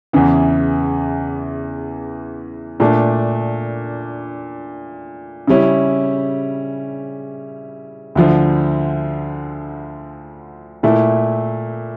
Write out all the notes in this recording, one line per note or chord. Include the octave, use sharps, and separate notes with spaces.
E2 C#3 E3
A#2 A3 D4
C#3 G3 C#4 E4
D2 D3 F3
A#2 A3 E4